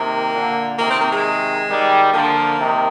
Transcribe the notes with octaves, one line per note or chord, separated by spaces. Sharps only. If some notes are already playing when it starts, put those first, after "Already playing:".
Already playing: C3 D#3 A#3
A#2 D3
C3 D#3 A#3
C4
A#3
G#3
D#3 G3
D3 F3 A#3
C3 D#3